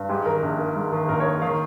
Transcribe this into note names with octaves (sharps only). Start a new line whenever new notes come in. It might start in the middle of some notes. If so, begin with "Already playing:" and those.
Already playing: G2
G#2 G4
D#3 A#4
A#1
A#3
G#2
D#3
A#1 A#4
C#5
A#3
D#3 F5